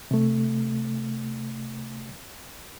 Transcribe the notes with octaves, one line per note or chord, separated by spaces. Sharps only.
C3 A3